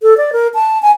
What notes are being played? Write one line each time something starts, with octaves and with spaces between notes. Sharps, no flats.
A4
D5
A#4
A5
G#5